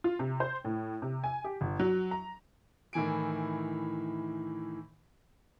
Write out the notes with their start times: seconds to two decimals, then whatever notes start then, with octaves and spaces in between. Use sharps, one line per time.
0.04 F4
0.19 C3
0.40 C5
0.65 A2
1.02 C3
1.24 G#5
1.44 G4
1.61 G1
1.80 F#3
2.11 A#5
2.93 A2 D#3 E3 G#5 D7